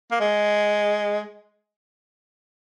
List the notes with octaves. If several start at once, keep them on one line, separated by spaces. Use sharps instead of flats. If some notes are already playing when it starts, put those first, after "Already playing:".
A#3
G#3